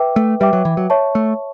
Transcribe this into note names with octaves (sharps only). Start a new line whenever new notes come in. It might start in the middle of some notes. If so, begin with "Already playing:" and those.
Already playing: B4 E5 G5 D6
A3
G3 B4 E5 G5 D6
F#3
E3
F#3
C#5 E5 A5 C#6
A3